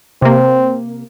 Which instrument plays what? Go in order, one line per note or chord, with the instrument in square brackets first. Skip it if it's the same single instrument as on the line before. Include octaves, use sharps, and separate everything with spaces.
[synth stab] C3 A#3 [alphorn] C4